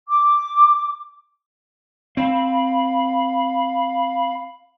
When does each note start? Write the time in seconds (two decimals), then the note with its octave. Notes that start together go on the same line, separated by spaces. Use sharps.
0.08 D6
2.17 C4 F5 B5